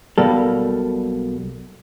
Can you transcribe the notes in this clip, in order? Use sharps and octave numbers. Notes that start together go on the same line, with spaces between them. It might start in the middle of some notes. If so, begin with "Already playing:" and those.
B1 B2 G3 A#3 A4